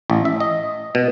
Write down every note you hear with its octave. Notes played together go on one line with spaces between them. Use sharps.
A1
E5
D#5
B2